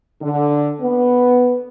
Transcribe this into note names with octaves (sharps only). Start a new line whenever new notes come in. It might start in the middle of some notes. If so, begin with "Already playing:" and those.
D3
B3